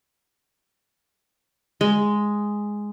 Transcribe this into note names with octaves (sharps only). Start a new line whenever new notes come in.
G#3